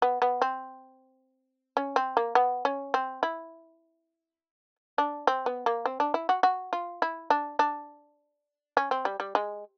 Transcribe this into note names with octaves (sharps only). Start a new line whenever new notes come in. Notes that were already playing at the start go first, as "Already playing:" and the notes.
B3
B3
C4
C#4
C4
A#3
B3
C#4
C4
E4
D4
C4
B3
A#3
C4
D4
E4
F#4
F#4
F4
E4
D4
D4
C#4
C4
G3
G3
G#3